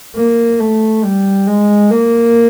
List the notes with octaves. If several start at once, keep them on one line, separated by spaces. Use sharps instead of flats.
A#3
A3
G3
G#3
A#3